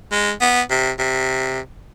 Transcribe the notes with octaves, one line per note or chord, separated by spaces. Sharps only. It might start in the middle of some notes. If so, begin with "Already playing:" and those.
G#3
B3
C3
C3